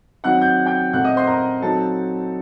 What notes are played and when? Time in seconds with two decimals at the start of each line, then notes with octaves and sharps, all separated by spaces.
0.24 D#3 F#3 C4 D#4 F#5 F#6
0.42 G6
0.66 G5 G6
0.93 A#2 A3 C4 F#5 F#6
1.04 D#5 D#6
1.16 C5 C6
1.27 A#4 A#5
1.62 F#3 C4 D#4 A4 A5